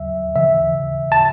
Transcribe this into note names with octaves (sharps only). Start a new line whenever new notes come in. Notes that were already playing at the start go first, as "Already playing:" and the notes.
Already playing: C#3 F#3 E5
C#3 E3 E5
A5